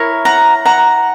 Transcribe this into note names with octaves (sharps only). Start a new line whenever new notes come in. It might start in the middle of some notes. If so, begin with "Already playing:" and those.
Already playing: E4 A#4 C#5
F#5 A#5
F#5 A#5